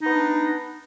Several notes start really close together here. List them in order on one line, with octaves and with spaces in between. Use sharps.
D#4 B3 D4